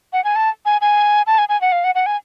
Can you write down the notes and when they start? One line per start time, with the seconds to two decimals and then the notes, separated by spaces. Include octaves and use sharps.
0.13 F#5
0.24 G#5
0.36 A5
0.66 G#5
0.81 G#5
1.27 A5
1.38 G#5
1.49 G#5
1.61 F#5
1.72 F5
1.84 F#5
1.95 F#5
2.06 G#5